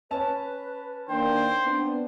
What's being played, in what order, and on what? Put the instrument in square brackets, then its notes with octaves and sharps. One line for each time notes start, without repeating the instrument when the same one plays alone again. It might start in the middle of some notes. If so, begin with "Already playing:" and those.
[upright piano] C#4 A5 [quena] B4
[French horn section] D#3 A#3 D4 [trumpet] C5 [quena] G5
[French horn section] B3 C4 D4